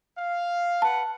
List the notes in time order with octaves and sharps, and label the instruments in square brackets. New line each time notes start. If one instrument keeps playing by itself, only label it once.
[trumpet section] F5
[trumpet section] B4 F#5 [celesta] A5